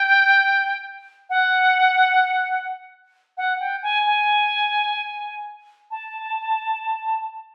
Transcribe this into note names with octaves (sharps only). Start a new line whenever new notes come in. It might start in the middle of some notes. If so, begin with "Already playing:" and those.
Already playing: G5
F#5
F#5
G5
G#5
G#5
A5